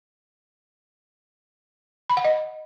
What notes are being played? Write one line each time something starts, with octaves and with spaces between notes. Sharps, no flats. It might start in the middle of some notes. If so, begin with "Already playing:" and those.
B5
F#5
D#5